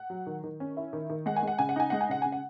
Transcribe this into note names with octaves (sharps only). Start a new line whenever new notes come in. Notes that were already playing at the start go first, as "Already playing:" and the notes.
Already playing: F#5
F#3
D#3
D#3
C#4
E4
D#3
D#3
G#3 F#5
G#5
G#3 F#5
C#3 G#5
F#5
D#4 G#5
G#3 F#5
G#5
C#3 F#5
C#3 G#5
F#5